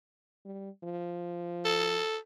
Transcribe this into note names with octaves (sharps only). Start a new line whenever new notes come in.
G3
F3
A4